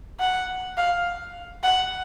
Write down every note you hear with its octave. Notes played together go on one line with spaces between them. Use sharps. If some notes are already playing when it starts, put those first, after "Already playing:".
F#5
F5
F#5